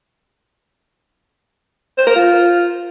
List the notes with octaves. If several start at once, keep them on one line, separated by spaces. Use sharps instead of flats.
C5
A#4
F4